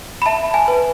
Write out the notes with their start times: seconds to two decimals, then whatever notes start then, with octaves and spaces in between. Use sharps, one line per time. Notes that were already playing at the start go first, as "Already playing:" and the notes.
0.22 B5
0.26 E5 A5
0.54 G#5
0.68 B4